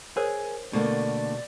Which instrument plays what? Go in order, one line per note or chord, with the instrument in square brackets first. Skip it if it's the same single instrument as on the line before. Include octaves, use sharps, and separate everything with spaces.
[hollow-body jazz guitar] G#4 [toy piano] A#4 C5 C#5
[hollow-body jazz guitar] B2 [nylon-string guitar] D3 A3 A#3 [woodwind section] D5